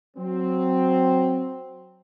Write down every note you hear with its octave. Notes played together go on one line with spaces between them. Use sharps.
F#3 C4